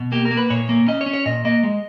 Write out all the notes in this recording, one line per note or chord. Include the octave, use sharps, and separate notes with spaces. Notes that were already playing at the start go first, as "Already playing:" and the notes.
Already playing: B2
A#3 G4
A#4
A#3
B4
A#2 C#5
A#3
C#4 D#5
C#5
C#4
C#5
A#2 D#5
A#3 D#5
G#3